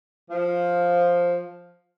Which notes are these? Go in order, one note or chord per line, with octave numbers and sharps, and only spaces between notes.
F3